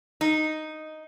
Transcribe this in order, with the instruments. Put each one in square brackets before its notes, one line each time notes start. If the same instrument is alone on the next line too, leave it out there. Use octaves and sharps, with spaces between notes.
[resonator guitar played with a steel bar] D#4